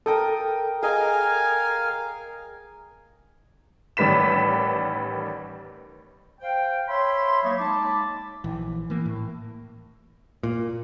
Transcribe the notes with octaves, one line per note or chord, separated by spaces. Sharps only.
A4 A#4 G5 D#6
G#4 A#4 D#5 F5 G#5
A1 D#3 G3 B4 B6 E7
C5 F5 G5
C#5 E5 B5 C6
F#3 A#3 D#4 C#5
G#3 D#4 A5 B5 D6
A#1 E3
E3 A#3
A2
A#2